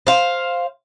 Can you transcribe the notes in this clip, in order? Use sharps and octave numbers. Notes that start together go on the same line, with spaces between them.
C5 F5